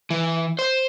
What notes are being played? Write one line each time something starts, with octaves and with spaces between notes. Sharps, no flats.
E3
C5